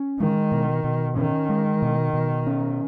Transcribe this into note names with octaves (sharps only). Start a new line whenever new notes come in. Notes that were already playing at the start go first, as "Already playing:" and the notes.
Already playing: C#4
D#3 G#3
B2
B2
D#3 C#4
G#3
B2
B2
C#4